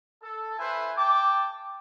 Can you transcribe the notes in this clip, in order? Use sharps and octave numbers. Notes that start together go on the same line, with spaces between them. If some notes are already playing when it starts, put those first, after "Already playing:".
A4
E4 B4 C5 E5 G#5
G5 A5 D6